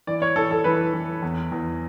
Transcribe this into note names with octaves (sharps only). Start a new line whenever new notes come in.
E3 D5
C#5
E3 A4
A4
E3 B4
E3
E2
E2